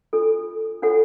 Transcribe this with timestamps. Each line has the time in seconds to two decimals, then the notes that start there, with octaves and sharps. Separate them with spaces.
0.13 D4 F4 A4
0.82 D4 F4 A4 C#5 F#5